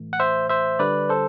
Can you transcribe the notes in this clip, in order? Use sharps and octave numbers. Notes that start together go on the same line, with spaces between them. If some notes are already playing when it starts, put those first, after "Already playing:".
Already playing: A2 E3 A3
F#5
C5 E5
C5 E5
D3 G3 B4 D5
A4 C5